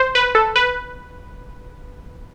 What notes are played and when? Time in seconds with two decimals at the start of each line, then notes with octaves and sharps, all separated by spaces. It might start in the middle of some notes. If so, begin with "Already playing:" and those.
Already playing: C5
0.15 B4
0.35 A4
0.56 B4